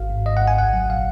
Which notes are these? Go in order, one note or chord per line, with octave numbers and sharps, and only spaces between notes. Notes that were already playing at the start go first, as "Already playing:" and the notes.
Already playing: G#1 F5
G#2
G#2 D#5
F#5
G#1
G#5
C2 F#5
F#3
A#2 F5